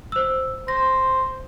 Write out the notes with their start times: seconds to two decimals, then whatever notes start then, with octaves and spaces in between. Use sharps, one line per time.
0.12 C5 E6
0.68 C5 A#6